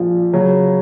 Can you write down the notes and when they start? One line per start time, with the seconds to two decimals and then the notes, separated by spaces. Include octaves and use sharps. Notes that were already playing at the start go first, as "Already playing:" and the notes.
Already playing: A#1 A#2 F3
0.33 C#3 F#3 C#4